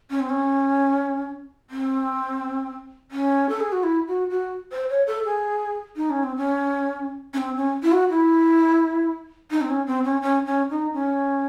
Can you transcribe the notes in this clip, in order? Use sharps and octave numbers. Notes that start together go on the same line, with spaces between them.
C#4
C4
C#4
C4
C#4
A4
G#4
F#4
E4
F#4
F#4
C5
C#5
A4
G#4
D#4
C#4
C4
C#4
C#4
C4
C#4
E4
F#4
E4
D#4
C4
C#4
C4
C#4
C#4
C#4
D#4
C#4